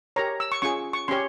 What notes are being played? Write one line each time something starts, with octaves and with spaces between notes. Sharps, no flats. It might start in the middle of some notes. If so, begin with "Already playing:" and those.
G4 A#4 C#5 A#5
E6
C#6
C#4 F4 G#4 C#6
C#6
C#4 G4 C#5 C6